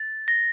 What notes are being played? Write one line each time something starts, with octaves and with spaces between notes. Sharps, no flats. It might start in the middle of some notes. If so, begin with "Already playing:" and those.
Already playing: A6
A#6